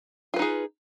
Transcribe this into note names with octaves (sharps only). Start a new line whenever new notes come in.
D#4 F4 G#4 B4